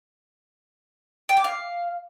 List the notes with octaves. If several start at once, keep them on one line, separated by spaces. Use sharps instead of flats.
G5
D6
F5